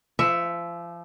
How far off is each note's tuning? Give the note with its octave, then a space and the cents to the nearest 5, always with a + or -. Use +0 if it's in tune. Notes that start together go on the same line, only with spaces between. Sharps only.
F3 -30 E5 +5